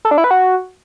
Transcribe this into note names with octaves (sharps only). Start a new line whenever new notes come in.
A4
D4
E4
B4
F#4